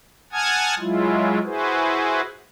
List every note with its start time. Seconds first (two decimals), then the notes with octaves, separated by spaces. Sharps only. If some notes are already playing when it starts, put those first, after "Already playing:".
0.32 F#5 G#5 A5 D#6 F6 G#6
0.79 F#3 G#3 E4 F4
1.44 E4 F#4 G#4 B4 C5